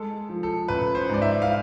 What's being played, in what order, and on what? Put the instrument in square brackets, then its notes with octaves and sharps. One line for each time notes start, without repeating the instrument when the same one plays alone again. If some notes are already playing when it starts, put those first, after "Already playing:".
Already playing: [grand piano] G#3 A4
F3
A4
A1 B4
C5
G#2 D5
E5
F5